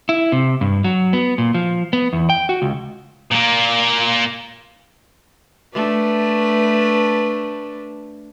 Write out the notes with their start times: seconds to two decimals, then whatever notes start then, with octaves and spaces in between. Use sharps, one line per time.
0.09 E4
0.32 C3
0.61 G2
0.84 F#3
1.13 B3
1.38 A#2
1.54 F3
1.93 B3
2.13 E2
2.30 G5
2.49 F#4
2.62 C#2
3.32 A#2 A#3
5.74 A3 D4 B4